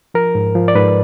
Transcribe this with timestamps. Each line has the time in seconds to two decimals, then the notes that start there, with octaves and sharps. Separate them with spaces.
0.14 F3 A#4
0.35 G#2
0.55 F3
0.68 D5
0.75 G#2 B4